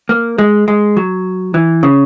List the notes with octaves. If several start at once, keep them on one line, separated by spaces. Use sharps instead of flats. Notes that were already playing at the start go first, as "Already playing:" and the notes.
A#3
G#3
G#3
F#3
E3
C#3